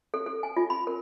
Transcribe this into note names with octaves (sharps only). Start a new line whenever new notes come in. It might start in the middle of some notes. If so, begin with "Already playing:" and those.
A4
A4
G#5
F4
B5
A#4